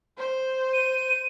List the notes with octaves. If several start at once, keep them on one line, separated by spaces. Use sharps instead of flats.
C5
D#7